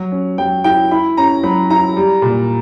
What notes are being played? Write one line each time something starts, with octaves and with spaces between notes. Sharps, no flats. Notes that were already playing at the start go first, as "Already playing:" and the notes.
Already playing: F#3
C#4
F#3 G5
E4 G5
E4 B5
C#4 A#5
F#3 B5
E4 A#5
G3
A#2